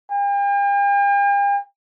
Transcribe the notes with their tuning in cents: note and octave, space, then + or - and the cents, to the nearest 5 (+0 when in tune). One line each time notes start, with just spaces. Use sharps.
G5 +45